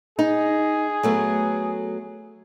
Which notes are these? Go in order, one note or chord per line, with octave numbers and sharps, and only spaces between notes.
D#4 G#4
F#3 A3 B3